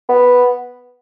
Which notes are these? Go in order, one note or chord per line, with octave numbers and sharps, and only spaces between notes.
B3